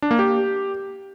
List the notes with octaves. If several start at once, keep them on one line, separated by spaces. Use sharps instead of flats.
D4
A#3
G4